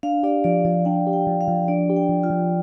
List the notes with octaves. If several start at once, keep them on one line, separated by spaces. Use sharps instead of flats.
D4 F5
G4 D5
F3 D5
F3 D5
D4 G5
G4
G5
F3
F5
F3
D4 D5
G4
G5
F3
F4
F3